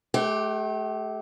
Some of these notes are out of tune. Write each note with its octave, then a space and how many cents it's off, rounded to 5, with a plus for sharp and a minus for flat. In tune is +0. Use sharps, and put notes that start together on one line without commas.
A3 -35 G4 +0 G5 -45